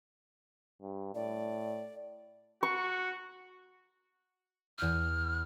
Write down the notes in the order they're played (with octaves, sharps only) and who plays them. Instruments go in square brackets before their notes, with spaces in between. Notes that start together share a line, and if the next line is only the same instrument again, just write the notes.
[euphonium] G2
[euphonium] A2 [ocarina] D5
[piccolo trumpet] F#4 [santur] C#6
[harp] E2 G6 D#7 [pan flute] F6